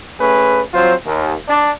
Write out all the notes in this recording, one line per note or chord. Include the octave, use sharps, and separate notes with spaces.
A3 C#4 G#4 B4
F#3 C4 F4 C5
D#2
D4